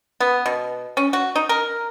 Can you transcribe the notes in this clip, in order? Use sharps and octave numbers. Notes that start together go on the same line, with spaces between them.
B3
B2
C#4
F#4
D#4
A#4